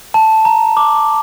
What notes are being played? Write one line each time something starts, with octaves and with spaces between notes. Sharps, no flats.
A5
A#5
D6